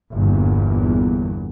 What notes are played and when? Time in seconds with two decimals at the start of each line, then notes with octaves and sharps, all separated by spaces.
0.12 G1 E2 A#2